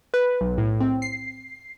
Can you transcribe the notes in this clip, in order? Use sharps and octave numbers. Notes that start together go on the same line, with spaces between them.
B4
B1
A2
C4
C7